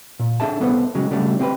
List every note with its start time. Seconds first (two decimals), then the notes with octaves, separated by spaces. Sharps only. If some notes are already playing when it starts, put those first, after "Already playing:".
0.19 A#2
0.40 D4 G#4 A4 E5 A5
0.60 C2 B3 A4 B4 C5
0.95 C#3 F#3 G#3
1.10 C#3 F#3 G3 A3 D4
1.39 C4 G4 G#4 B4